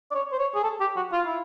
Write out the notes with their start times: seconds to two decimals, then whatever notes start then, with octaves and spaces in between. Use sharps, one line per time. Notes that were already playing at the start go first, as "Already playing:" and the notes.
0.11 D5
0.15 C#5
0.32 C5
0.39 C#5
0.55 G#4
0.64 A4
0.81 G4
0.96 F#4
1.12 F4
1.27 E4